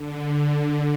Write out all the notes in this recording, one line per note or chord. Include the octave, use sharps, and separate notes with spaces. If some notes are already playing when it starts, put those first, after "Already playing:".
Already playing: D3